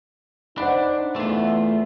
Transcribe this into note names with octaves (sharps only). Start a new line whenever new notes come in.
D4 D#4 C5 F#5 B5
E2 A3 F4